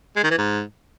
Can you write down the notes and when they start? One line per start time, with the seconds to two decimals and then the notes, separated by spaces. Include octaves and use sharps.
0.16 G#3
0.23 D#3
0.31 E3
0.38 G#2